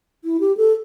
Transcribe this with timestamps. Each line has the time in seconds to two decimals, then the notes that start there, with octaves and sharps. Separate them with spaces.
0.24 E4
0.40 G4
0.57 A4